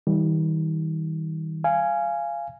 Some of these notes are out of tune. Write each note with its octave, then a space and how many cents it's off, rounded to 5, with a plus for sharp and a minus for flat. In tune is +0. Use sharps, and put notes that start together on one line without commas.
D#3 +40 G3 -10
F5 -20 G#5 +0